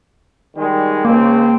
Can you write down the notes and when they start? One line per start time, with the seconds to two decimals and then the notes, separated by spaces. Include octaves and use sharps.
0.56 D#3 G3 G#3
1.05 C#2 C#3 A#3 C4